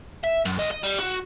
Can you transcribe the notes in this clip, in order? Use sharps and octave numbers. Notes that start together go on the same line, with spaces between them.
E5
F#2
C2 D#5
D#5
G3
F#4